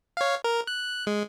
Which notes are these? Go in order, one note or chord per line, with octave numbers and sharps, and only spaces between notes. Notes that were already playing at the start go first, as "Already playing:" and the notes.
C#5 F5
A#4
F#6
G#3